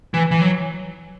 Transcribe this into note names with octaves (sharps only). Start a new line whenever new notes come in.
E3
E3
F#3